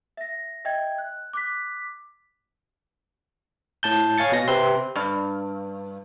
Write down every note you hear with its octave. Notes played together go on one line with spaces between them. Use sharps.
E5 A#6
D#5 E5 G5 G#6
F#6
D6 F#6 B6
A2 A5 G6
C#5 F5 G#5 A6 C#7
B2 A#6
C3 C4 B4 C6
G2